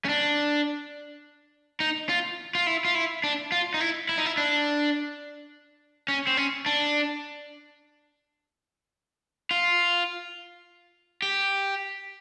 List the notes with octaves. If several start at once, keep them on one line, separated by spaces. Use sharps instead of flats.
C#4
D4
D#4
F4
F4
E4
F4
E4
D4
F4
D#4
E4
E4
D#4
E4
D4
C#4
C4
C#4
D4
F4
G4